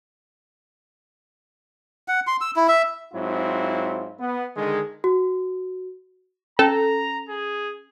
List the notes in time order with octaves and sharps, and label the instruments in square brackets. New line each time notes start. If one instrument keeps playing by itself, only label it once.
[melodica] F#5
C6
E6
E4
E5
[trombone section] G#2 F#3 C4 E4 F4
B3
D3 D#3 G#3
[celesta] F#4
[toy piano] C#4 [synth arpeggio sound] A4 [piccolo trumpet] A#5
[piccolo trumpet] G#4